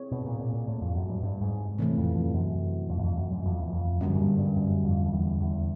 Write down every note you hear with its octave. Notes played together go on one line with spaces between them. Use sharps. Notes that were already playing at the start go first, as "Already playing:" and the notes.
Already playing: C4 E4 G#4 C#5
B2
A#2
A#2
A#2
A2
F2
F#2
G2
G2
G#2
A2 C3 E3 A3 C4
F2
F2
F2
F#2
F2
F#2
F2
F#2
F#2
F2
E2
F2
F#2 D3 G3 A#3 C#4
G#2
G2
G2
F#2
F2
F2
E2
E2